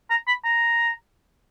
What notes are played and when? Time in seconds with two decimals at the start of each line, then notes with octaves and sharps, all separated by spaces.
0.10 A#5
0.27 B5
0.44 A#5